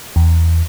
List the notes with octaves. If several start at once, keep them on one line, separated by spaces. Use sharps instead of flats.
E2